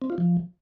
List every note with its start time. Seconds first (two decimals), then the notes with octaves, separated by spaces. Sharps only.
0.02 C4
0.10 F4
0.18 F3